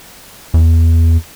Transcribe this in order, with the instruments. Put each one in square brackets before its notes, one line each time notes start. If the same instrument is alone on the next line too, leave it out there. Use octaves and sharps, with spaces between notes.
[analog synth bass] E2